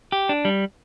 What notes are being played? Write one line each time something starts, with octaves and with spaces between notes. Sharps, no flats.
G4
D4
G3